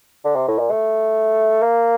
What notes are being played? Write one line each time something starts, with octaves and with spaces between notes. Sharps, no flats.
D3
C3
A2
A#2
A3
A#3